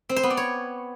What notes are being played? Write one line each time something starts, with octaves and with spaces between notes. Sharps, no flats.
C4
C5
B3
D5
C#5